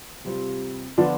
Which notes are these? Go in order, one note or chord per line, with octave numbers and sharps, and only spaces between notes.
C3 G3 C4 F4
D3 F3 B3 D4 F4